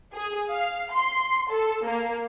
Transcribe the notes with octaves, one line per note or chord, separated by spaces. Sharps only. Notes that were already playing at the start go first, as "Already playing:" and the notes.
G#4
F5
C6
A4
A#3